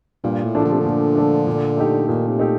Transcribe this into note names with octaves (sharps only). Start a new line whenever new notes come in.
G2 A#2
A2
F3 A3 D4
D3
C3
D3
A#2
F3 A3 D4
A#2
A3 D#4 G4
A#2 D#3
C3
A3 D#4 G4